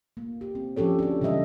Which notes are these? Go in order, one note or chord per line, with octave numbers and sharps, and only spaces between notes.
A#3
G4
C4
F3 C#4 G4 A4 C#5
D4 F#4 A4
C#3 E3 G3 D#5 E5